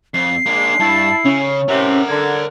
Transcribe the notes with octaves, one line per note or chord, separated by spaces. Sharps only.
F2 C7
G#3 A#3 D4
G2 E4 A5
C#3 C#4
A2 C3 A#4 F#5
D3 G#6